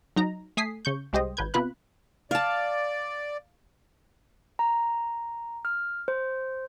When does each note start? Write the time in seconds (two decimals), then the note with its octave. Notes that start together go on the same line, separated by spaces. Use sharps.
0.16 F#3 D#4 A#5
0.57 A3 G#5 D#6 B6 C7
0.85 C#3 C#6 G6
1.13 C2 G#3 G4 C5 D#5
1.37 G#1 B4 G6 G#6
1.54 C3 B3 F4 B4 B5 F#6
2.31 D5 F5 A5
4.59 A#5
5.65 F6
6.08 C5